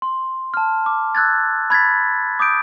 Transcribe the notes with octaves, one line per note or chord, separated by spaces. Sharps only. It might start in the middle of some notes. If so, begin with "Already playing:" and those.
C6
A5 F6
D6
E6 F#6 G#6 A6
B5 G#6 A6 B6
D6 D#6 G6 D7